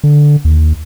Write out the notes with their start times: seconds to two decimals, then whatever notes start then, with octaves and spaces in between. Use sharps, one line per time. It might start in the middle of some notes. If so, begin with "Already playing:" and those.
0.04 D3
0.45 D#2